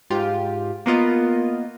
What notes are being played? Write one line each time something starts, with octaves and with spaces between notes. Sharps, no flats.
G#2 F4 G4
A#3 B3 F4 D#5